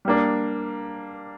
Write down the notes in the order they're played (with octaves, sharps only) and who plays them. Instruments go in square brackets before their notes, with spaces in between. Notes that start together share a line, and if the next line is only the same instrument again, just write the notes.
[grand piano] G3 A#3 D4